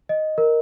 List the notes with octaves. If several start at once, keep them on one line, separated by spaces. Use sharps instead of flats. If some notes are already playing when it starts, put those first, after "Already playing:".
D#5
A#4